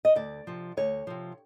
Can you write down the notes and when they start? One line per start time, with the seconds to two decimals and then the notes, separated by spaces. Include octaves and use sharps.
0.05 D#5
0.16 D2 D5
0.47 C3 F3
0.77 D2 C#5
1.07 C3 F3